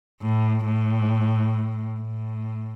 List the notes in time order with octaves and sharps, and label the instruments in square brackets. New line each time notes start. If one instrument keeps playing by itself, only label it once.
[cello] A2
A2
A2